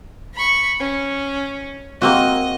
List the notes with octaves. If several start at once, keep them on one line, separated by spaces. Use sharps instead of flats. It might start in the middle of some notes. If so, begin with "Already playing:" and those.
B5 C#6
C#4
A#3 C4 F#4 D#5